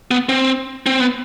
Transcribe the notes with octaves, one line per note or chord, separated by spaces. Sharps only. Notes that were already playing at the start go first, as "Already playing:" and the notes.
B3
C4
C4
B3